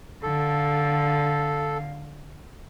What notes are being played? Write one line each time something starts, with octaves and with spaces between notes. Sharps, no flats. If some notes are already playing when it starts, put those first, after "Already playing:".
D3 A4 F5